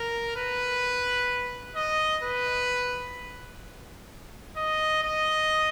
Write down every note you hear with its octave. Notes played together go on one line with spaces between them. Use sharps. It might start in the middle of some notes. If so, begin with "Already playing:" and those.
Already playing: A#4
B4
D#5
B4
D#5
D#5